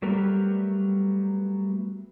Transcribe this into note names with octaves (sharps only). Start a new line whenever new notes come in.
F#3 G3 A3 B3 G4 A#4